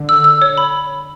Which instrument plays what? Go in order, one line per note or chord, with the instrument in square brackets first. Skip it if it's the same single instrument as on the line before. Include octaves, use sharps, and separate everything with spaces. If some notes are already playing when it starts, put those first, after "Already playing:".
Already playing: [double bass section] D3
[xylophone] E6
E6
C#5
B5